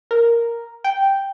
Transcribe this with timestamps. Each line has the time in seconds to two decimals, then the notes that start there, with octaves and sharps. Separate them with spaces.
0.11 A#4
0.84 G5